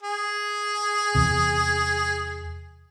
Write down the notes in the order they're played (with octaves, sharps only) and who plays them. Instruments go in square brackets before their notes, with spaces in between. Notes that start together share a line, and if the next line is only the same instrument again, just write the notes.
[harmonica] G#4
[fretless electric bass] E2 C3